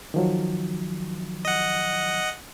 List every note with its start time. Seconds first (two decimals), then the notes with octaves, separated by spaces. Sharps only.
0.14 D#3 F3 F#3
1.45 D#5 F#5